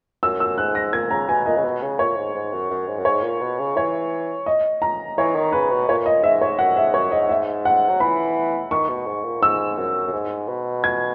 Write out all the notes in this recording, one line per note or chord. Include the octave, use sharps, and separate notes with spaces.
F#2 E6
E6
G#2 F#6
A#6
A#2 G#6
C#3 A#5
B2 G#5
A#2 D#5
C#3
B2
C#3
A#2 C#5
G#2
G#2
F#2
F#2
G#2
F#2
G#2 C#5
A#2
B2
C#3
E3 C#5
D#5
A#5
E3 C#5
D#3
C#3 B4
B2
A#2 C#5
D#5
G#2 E5
C#5
F#2 F#5
G#2 E5
F#2 C#5
G#2 D#5
E5
F#5
F#3
E3 B5
D#3 C#6
B2
G#2
A#2
G#2 E6
F#2
F#2
G#2
B2
G#6